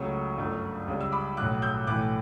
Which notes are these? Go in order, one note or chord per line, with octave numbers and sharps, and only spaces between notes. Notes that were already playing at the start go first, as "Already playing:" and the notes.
Already playing: C#2 C#3 F#3 A3 C#6 E6
G1 F#2 D3 A3
C#2 C#3 G3
E6
B5 D6
B1 A2 F#3 A3 D6 F#6
E6 G6
B1 A2 E3 A3 D6 F#6